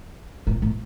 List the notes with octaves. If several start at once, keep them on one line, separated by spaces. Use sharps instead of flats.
A2
A2